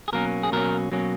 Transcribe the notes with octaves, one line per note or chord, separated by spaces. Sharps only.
G#4
B2 F#3 A#3 C#4 A#4
G#4
B2 F#3 A#3 C#4 A#4
B2 F#3 A#3 C#4